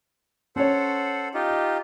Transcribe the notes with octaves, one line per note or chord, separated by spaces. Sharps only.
C#4 A4 C5 C#5 F#5
D#4 F4 G4